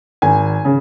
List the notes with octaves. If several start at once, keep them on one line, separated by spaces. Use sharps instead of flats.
G#1 G#5
C#3